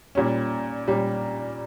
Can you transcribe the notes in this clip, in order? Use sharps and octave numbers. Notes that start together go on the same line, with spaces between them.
A#2 G3 C#4
A#2 G3 C#4